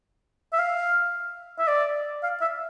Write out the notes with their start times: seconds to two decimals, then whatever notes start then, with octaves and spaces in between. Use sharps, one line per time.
0.53 E5
0.58 F5
1.59 E5
1.68 D5
2.23 F5
2.41 E5